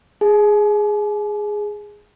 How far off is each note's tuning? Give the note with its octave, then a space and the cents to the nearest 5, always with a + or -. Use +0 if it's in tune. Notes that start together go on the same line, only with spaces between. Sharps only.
G#4 +0 G#5 +45